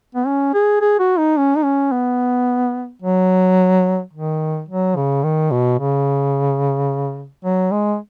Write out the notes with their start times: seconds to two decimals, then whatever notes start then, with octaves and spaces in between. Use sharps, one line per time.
0.15 B3
0.27 C#4
0.54 G#4
0.81 G#4
0.99 F#4
1.18 D#4
1.38 C#4
1.57 D#4
1.64 C#4
1.92 B3
3.02 F#3
4.13 D#3
4.69 F#3
4.96 C#3
5.24 D#3
5.51 B2
5.79 C#3
7.45 F#3
7.72 G#3